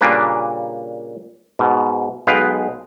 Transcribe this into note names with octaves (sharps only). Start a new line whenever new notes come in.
A#2 C#3 G3 A#3 D4 B4
G#2 B2
B1 G#3 B3 B4 F5 G5